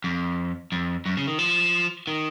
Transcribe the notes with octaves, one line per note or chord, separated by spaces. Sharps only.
F2
F2
F#2
C#3
D#3
F3
D#3